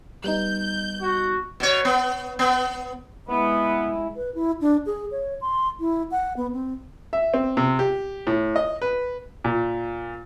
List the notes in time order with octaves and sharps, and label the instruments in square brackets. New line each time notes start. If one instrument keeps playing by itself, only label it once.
[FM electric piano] G3 B3 D#4 [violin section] G6
[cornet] F#4
[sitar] B2 C#5
B3
B3
[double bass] G#3 E4 [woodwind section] B3
[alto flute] B4
E4
D4
G#4
C#5
C6
E4
F#5
B3
C4
[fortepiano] E5
C4
C3
G4
A2
D#5
B4
[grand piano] A#2